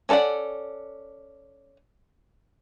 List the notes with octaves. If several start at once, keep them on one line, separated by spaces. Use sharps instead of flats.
C#4 A4 A#4 D5 F#5